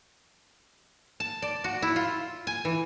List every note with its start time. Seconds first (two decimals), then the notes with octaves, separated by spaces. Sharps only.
1.20 A5
1.42 D5
1.64 F#4
1.82 E4
1.96 F4
2.47 G#5
2.65 E3